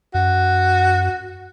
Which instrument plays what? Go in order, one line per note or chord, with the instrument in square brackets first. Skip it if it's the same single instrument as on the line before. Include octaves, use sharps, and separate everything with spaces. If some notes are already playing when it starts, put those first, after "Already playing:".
[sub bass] F#2 [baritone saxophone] F#4